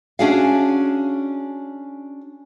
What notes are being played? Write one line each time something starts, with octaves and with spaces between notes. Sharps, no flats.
C#4 D4 F#4 G#4 E5 F5